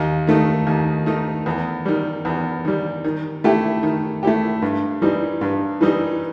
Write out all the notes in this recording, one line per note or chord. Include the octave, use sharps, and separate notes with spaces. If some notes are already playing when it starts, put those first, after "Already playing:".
Already playing: D#2
D#3 A3 D#4
D#2
D#3 A3 D#4
E2
D#3 G3
E2
D#3 G3
D#3
A3 E4 G4
D#3
A3 E4 G4
G2
E3 G3 D#4
G2
E3 G3 D#4